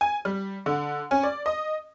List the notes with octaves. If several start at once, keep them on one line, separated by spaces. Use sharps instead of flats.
G#5
G3
D3
C#4
D5
D#5